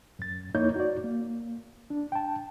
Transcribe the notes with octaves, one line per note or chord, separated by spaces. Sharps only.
F#2 A6
F2 A#3 D#4 E4 C#5 G6
F#4 D5
A#3
D4
G5 A5